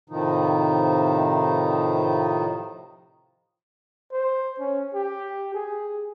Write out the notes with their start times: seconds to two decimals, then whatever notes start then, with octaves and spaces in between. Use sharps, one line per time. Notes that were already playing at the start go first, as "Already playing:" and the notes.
0.10 A2 C3 D#3 F3 D#4
4.12 C5
4.60 C#4
4.94 G4
5.54 G#4